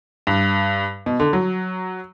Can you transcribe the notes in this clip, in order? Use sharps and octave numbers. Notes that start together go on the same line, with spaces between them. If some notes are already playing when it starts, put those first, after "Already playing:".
G2
B2
D3
F#3